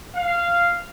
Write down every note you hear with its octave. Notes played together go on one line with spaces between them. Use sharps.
F5